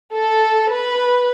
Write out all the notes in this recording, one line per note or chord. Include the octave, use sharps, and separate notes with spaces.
A4
B4